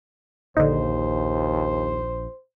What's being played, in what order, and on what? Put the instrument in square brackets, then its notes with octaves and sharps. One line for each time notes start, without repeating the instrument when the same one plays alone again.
[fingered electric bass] A#1 [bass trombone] D#2 [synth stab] D3 D#4 [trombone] C5